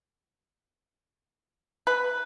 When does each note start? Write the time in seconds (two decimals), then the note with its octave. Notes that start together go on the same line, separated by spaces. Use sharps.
1.87 B4